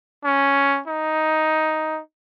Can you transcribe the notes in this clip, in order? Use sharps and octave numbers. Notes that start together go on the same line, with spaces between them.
C#4
D#4